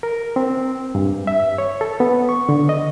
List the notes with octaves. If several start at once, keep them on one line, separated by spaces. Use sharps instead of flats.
A#4
C4
G2
E5
C#5
A4
B3
C#6
D3
D#5